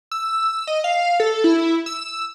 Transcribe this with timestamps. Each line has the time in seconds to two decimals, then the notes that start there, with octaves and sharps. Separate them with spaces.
0.11 E6
0.67 D#5
0.84 F5
1.20 A4
1.44 E4
1.86 E6